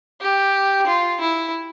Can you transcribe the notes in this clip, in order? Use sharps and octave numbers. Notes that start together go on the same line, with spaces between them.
G4
F4
E4